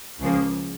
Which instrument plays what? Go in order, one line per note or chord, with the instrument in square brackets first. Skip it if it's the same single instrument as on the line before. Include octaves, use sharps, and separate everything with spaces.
[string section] C#2 C#3 F3 A#3